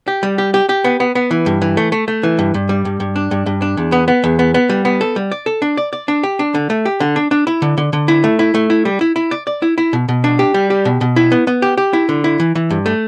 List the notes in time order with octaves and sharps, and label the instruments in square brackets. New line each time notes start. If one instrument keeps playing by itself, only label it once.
[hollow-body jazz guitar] G4
G3
G4
G4
G4
B3
B3
B3
E3
G2
E3
A3
A3
A3
E3
G2
G2
G3
G2
G2
D4
G2
G2
D4
E2
B3
B3
E2
B3
B3
G3
B3
A4
G3
D5
A4
D4
D5
D5
D4
G4
D4
D3
A3
G4
D3
D4
D4
E4
D3
D3
D3
E4
A3
E4
A3
E4
G3
E4
E4
D5
D5
E4
E4
B2
B2
D4
G4
G3
G4
B2
B2
E4
B3
B3
G4
G4
E4
D3
E4
E3
E3
G2
A3